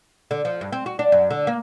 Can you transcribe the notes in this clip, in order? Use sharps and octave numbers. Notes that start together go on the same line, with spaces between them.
D3
F3
G2
C4
F#4
D4
F#2
D3
A#3